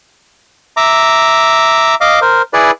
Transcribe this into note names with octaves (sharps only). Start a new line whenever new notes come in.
E5 A#5 D6
D#5 F5 D6
A#4 C5
E4 G#4 B4 D5